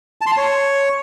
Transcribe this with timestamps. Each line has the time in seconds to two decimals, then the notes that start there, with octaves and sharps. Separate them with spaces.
0.21 A5
0.27 C6
0.32 A5
0.37 C#5